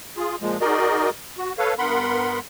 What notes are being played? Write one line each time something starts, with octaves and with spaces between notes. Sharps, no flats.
F4 G#4
A#2 F3 G#3
D#4 F#4 G#4 A#4 D5 D#5
F#4
A4 B4 C#5 F5
G2 B3 A#4 F#5 B5 C6